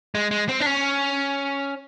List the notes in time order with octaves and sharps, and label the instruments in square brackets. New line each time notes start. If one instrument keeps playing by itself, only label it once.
[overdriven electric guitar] G#3
G#3
C4
D4
C#4